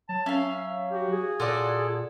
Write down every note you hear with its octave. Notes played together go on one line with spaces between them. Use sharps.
F#3 A5
C#4 E5 F5
F#4 G4
G#4
A#2 F4 F#4 A4 D5